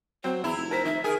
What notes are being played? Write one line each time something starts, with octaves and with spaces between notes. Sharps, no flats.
F#3 C4 C5
E2 E4 A#5
F1
A#4 C5 B6
D#3 E5
G#4 A#4